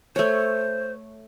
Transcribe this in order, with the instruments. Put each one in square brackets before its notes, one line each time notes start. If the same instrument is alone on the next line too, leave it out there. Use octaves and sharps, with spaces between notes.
[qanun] A3 C#5 [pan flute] C5